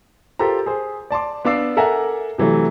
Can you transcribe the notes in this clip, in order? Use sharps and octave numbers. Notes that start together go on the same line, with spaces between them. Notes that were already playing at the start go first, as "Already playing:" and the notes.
F4 G4 A4 A#4 C5 A#5
G#4 C5
D5 A5 C6 D6
B3 D4 F5 D6 E6 C7
A4 A#4 E5 F#5 G#5 A#5
C3 E3 F#3 A3